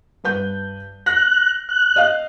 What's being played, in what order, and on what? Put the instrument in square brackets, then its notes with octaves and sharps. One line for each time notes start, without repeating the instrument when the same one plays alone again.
[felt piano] G2 B4 G6
[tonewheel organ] F#6 [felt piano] A#6
[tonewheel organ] F#6
[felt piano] D#5 F5